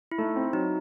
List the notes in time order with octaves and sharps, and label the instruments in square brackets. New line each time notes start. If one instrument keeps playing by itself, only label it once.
[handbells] E4
[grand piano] A3 [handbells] D#4
[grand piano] C4
[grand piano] F#3 [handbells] D#4